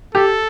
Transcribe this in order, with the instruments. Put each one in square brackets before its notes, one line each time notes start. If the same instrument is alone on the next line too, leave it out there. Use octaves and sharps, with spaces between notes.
[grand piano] G4 [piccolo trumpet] A4